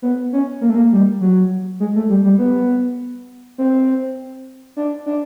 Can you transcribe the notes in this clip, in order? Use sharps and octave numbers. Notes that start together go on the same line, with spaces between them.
B3
C#4
A#3
A3
A#3
G3
F#3
G#3
A3
G3
G3
B3
C4
D4
D4